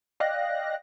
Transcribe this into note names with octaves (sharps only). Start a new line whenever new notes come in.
D5 D#5 F5 G5 F#6 A#6